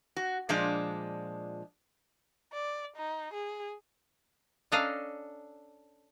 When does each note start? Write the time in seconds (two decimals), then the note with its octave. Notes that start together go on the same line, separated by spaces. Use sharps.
0.16 F#4
0.49 A#2 F3 G#3 D4
2.53 D5
2.96 D#4
3.33 G#4
4.72 C#4 D4 A4 D#5 F5 A#5